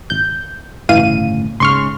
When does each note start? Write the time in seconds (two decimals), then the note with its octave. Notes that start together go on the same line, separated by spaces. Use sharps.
0.10 G#1 G6
0.89 G1 A2 C#3 E3 F5 D#7
1.60 C#2 G#2 C#3 C6 C#6 F6